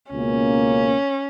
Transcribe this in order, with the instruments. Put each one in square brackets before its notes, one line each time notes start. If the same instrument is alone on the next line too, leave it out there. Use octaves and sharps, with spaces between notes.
[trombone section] C#2 B2 A#3 [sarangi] C#4